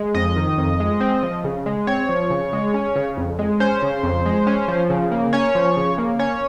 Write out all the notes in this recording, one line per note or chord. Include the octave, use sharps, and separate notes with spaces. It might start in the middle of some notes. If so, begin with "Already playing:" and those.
Already playing: G#3
F2 D#5
D#3
F2
G#3
C4
F3
C#3
G#3
C4 C#5
F3
C#3
G#3
C#4
C#3
F2
G#3
C#4 C5
C#3
F2
G#3
C#4
F3
C#3
A#3
C#4 C#5
F3
C#3
A#3
C#4 C#5